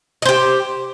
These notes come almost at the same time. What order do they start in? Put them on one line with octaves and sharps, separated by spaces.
D#5 C5 G4